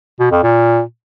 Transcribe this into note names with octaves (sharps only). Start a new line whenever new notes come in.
B2
F2
A#2